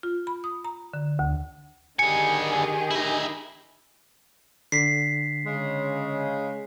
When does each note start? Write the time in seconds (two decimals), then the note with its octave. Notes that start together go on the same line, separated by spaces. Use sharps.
0.03 F4
0.27 B5
0.44 D#6
0.65 A#5
0.94 D3
1.19 D2
1.99 D3 D#3 G4 G#4 G#5 C#7
2.91 E4 D#5
4.72 D3 B6 C7
5.45 C#3 G#3